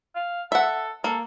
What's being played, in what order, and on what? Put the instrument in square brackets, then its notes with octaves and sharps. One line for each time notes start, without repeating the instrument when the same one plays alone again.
[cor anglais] F5
[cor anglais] A4 [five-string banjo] E5 F#5
[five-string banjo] A#3 [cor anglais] A4